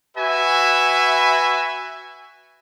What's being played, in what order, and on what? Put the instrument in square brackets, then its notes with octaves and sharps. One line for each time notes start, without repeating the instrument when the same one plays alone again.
[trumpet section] F#4 B4 E5 G#5